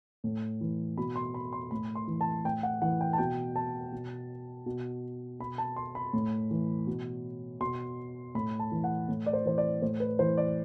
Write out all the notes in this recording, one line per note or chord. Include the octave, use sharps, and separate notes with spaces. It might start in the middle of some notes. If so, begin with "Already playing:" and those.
A2
E3
B2 B5
C6
B5
C6
A2 B5
C6
E3
A5
A2 G5
F#5
E3 F#5
G5
A5
B2 G5
A5
B2
B2
B2 B5
A5
C6
B5
A2
E3
B2
B2 C6
A2 B5
A5
E3
F#5
A2
D5
C5
E3 C5
D5
A2 C5
B4
E3 C5
D5